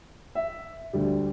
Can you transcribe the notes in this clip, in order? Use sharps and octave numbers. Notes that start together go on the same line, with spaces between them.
E5
D2 D3 G3